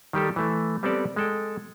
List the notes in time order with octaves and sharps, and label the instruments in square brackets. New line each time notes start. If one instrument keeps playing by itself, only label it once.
[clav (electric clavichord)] D#3 G3 G4 A4
E3 A3
G3 B3 C4 G4 A4 D5
G#3 A4 G5